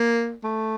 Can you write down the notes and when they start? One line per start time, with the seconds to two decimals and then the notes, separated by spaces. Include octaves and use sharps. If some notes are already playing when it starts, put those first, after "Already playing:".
Already playing: A#3
0.44 A3